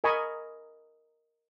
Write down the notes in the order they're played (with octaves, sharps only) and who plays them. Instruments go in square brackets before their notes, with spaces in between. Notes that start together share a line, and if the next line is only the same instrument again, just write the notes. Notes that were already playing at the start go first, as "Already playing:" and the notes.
[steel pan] A#4 D#5 G#5 B5 C#6